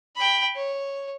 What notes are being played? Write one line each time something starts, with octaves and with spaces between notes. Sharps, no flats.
G5 B5
C#5